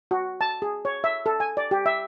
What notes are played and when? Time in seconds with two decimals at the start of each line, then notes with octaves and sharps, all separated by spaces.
0.11 F#4
0.41 A5
0.62 G#4
0.85 C#5
1.04 E5
1.26 A4
1.40 G#5
1.57 D5
1.71 G4
1.86 E5